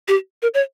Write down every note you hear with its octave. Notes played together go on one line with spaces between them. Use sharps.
G4
A#4
C#5